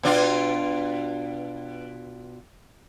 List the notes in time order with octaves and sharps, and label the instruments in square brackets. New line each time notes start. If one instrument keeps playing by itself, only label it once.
[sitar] B2 D4 F4